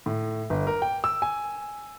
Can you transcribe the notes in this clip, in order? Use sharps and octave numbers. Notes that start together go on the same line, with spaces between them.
A2
G1
A#4
G5
E6
G#5